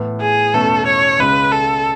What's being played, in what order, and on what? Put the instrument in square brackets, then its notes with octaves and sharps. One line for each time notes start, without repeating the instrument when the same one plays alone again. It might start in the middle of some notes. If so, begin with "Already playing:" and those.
Already playing: [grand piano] A2 E3 B3
[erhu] G#4
[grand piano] E2 B2 A3 C#4 [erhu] A4
[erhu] C#5
[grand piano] C#2 C#3 G#3 C#4 [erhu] B4
[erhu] A4